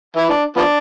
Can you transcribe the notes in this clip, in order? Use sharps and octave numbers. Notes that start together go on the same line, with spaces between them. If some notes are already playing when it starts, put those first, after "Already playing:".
E3 E4
D4
F3 B3 D4